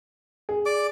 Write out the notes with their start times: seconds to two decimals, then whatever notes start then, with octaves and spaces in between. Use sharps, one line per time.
0.49 G#4
0.66 D5 D6